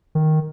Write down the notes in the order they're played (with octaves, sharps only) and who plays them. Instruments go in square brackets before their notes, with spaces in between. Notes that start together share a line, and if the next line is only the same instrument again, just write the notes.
[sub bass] D#3